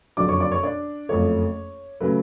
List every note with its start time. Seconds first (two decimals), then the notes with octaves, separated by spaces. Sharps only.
0.17 F#1 F2 D3 F#3 D5 D6
0.28 C#5 C#6
0.40 D5 D6
0.52 C#5 C#6
0.63 D4 D5
1.09 F#1 F2 F3 A3 C#5
2.01 C#3 F#3 A3 B4